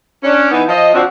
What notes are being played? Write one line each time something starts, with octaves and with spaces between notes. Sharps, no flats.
C#4 D4
E3 B3 D#4
F3 D#5
F3 C4 D4 F#4